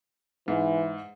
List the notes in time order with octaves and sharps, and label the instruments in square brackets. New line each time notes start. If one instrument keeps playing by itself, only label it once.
[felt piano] G#2 [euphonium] E3